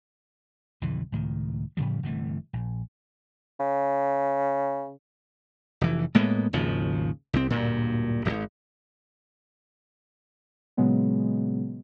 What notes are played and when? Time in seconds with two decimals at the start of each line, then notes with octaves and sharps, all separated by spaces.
0.82 B1 F2 D3 E3
1.12 C#2 A2 D#3
1.77 A2 C#3 F3 G3
2.03 G1 C3 E3 A3
2.53 A#1
3.60 C#3
5.81 F1 E3
6.15 A2 G#3 A#3 B3
6.53 G#1 D#2 C#3 F3
7.33 C2 C4
7.50 D1 G2 A#2
8.25 D#1 G#1
10.77 A#2 C#3 F#3 G#3 B3